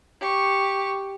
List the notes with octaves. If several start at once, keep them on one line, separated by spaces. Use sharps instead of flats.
G4 C#6